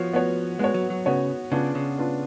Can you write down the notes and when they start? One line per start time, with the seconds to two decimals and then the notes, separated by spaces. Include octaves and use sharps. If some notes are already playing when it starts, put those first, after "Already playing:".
Already playing: F3 B3 F#4 C#5
0.13 B3 F#4 C#5
0.59 G#3 B3 F#4 C#5
0.74 F#3
0.90 F#3
1.06 C#3 B3 F#4 C#5
1.52 C#3 B3 D4 F4
1.75 C#3
1.98 B3 D4 F4